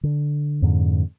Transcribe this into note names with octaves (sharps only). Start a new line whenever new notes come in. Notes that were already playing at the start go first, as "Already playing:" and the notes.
D3
F2 G#2 D3